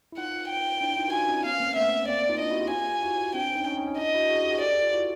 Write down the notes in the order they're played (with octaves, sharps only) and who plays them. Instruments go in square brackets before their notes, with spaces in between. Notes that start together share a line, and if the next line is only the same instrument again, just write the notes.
[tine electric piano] E4
[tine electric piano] D#4 F4 [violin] F#5
[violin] G5
[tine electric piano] D4 E4
D#4 F4
F#4
[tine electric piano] D#4 F4 [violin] G#5
[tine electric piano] C#4 D#4
[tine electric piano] B3 C#4 [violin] F5
[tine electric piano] A#3 C4
[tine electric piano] A3 B3 [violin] E5
[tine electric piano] A#3 C4 [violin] D5
[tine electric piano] D#4 F4
[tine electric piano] D4 E4 [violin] D#5
[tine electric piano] E4 F#4
F4 G4
[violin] G#5
[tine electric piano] E4 F#4
[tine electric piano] C4 D4 [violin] G5
[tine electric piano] C#4 D#4
C#4 D#4
C#4 D#4
C#4 D#4
[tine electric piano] D4 E4 [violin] D#5
[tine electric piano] E4 F#4
F#4 G#4
G4
F#4 G#4
[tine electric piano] G4 A4 [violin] D5
[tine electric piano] G4 A4
F4 G4
E4 F#4